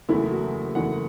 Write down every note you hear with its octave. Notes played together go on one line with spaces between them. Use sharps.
F#1 E2 E3 A3 E4
F#4
F#1 E2 E3 A3 F#5